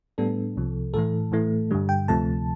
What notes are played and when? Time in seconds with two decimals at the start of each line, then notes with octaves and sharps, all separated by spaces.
0.18 A2 G3 B3 D4 A4
0.56 C2 C3 F3
0.94 A2 E3 A3 A4
1.32 A2 E3 A3
1.71 G2 D3 G3
1.89 G5
2.08 D2 C3 F3 A3 A5